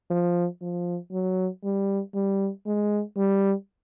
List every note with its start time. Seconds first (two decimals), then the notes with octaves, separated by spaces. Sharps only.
0.11 F3
0.62 F3
1.12 F#3
1.64 G3
2.14 G3
2.66 G#3
3.17 G3